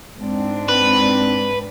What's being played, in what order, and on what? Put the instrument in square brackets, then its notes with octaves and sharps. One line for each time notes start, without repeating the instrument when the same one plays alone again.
[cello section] G#2 C4 D4
[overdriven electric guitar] B4